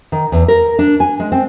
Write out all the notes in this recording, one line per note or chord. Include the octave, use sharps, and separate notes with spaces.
D#3
E2
A#4
D4
G#5
G#3
C4